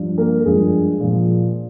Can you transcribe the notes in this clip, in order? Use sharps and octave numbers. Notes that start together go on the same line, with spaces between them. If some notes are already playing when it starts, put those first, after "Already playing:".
Already playing: G2 F3
A#3 A#4
G2 F3 G#3 G#4
A#2 F3